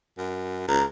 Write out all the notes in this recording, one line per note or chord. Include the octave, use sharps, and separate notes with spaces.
F#2
C#2 A#5